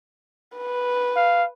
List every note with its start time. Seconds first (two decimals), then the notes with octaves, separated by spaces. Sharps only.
0.57 B4
1.16 F5